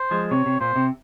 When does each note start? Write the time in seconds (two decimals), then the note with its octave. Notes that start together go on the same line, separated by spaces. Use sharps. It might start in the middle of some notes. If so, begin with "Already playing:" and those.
Already playing: C5
0.11 F3 G#3
0.31 C3 C#5
0.46 C3
0.60 A#2 C5
0.76 C3